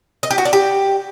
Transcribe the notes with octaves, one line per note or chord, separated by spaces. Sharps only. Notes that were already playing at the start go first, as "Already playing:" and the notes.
D#5
G4
F#4
D4
G4